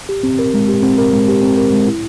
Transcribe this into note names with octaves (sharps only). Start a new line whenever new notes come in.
G4
C4
A#4
G#3
G4
C4
A#4
G#3
G4
C4
A#4
G#3
E4